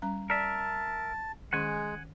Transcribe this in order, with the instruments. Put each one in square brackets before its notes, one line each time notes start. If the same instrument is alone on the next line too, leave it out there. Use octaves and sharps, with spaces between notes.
[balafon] G3 C#4 A#5
[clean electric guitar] A#4 E5 [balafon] D5 [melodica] A5
[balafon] D#3 C#4 [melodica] G#3 [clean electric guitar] F#5 G#5